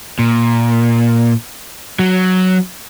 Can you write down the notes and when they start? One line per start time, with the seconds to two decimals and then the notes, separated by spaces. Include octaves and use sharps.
0.19 A#2
1.99 F#3